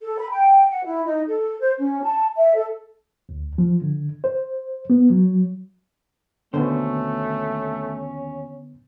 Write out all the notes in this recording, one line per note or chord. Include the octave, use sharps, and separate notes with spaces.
A4
B5
G5
F#5
E4
D#4
A4
C5
C#4
A5
E5
A4
D2
F3
D3
C5
B3
F#3
D#2 B2 D3 A3 B3 C#4 C5